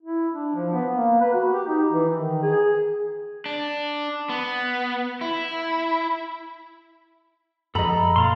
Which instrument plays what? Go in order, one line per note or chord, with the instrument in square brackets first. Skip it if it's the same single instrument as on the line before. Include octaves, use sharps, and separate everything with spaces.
[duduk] E4
D4
F3
B3
A#3
B4
F#4
G4
D#4
E3
D#3
G#4
[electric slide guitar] D4
B3
E4
[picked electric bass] F#2 F3 [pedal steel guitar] A4 B5 [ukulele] D#5 A#5
[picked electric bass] A#2 [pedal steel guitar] A4 F5 C6